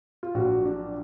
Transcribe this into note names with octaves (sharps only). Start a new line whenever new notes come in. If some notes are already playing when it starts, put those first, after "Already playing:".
F4
A#1 A#2 F#3 F#4
D4